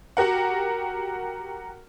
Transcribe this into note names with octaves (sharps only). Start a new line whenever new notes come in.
F#4 G4 A#4 F#5